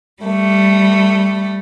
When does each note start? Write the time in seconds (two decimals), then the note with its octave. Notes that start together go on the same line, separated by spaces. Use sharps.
0.22 G3 A3